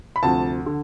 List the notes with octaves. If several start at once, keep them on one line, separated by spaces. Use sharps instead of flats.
B5
D2 C3 F3 A5
D3